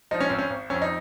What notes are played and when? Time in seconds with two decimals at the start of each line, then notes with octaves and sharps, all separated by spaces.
0.11 F3 D#4
0.20 C#4
0.29 G#1 C4
0.38 C#4
0.50 G#1
0.70 F2 C#4
0.82 D#4